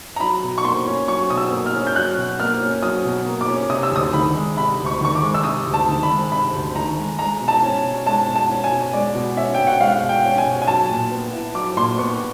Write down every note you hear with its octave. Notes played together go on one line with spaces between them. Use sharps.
A#5
F#3 B5
B2
C#6
A#3 C6
C#4
F#3 C#6
B2 D#6
E6
A#3
F6
C#4
G6
F#3 F#6
B2
A#3 F6
C#4
F#3 D#6
B2
A#3
D6
C#4
C3 D#6
E6
D2 D#6
D#3 B5
G#3
C3 B5
D2
C#6
D#3 C#6
D6
G#3
E6
C3 D#6
D2
A5
D#3
B5
G#3
C3 B5
D2
D#3 A#5
G#3
G#3 A#5
B2
A5
C#4
B2
G#3 A5
B2
A5
C#4
G#5
B2
G#3 D5
B2
C#4 E5
B2 G5
F#5
G#3 F5
B2
G5
C#4
G#5
B2
G#5
F#3 A5
A#2
B3
E4
F#3 D6
A#2 C6
B3 C#6